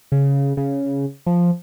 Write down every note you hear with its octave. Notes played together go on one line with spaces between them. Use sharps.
C#3
C#3
F3